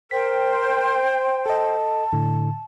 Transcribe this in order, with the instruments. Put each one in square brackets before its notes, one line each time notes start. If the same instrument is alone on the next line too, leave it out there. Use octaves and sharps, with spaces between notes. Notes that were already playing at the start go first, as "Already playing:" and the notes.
[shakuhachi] A#4 [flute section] C5 G5 [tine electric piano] B6
[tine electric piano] A4 D#5 [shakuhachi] A5
[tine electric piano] A2 D3